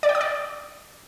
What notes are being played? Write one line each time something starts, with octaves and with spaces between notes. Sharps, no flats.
D5
G5
D#6
D5